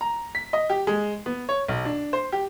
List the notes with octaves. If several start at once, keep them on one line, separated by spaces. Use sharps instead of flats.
A#5
B6
D#5
G4
G#3
B3
C#5
B1
D4
C5
G4